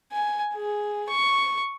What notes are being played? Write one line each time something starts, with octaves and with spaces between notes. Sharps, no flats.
G#5
G#4
C#6